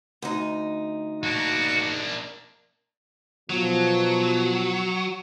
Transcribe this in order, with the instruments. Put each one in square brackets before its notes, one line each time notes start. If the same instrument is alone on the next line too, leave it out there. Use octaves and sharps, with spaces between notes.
[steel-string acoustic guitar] D2 D#4
[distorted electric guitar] A#3 D4 [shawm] F#4
[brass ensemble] B2 F3 [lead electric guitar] F#3